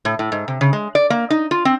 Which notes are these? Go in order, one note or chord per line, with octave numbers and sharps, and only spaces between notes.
A2
A2
G#2
C3
C#3
G#3
D5
A#3
D#4
F4
C4